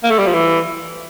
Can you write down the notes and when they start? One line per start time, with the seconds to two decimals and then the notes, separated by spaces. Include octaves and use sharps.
0.04 A#3
0.11 A3
0.19 G3
0.27 F3
0.33 E3